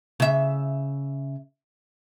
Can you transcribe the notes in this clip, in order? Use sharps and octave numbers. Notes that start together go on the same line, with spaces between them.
C#3 E5